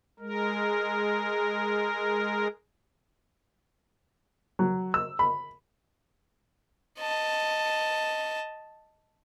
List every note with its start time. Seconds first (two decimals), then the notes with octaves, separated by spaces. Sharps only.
0.20 G#3 A#4
4.59 F#3
4.94 E6
5.19 B5
6.99 D#5 A5